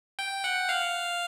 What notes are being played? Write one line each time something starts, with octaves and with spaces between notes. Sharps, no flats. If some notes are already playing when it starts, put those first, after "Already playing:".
G5
F#5
F5